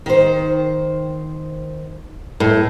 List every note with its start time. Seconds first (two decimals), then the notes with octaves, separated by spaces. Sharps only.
0.06 D#3 C5
2.40 A2